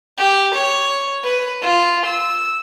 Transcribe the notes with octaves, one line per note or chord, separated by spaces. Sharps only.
G4
C#5
B4
F4
E6